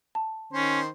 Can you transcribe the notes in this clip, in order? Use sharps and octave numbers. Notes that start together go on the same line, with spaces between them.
A5
D#3 C#4 C5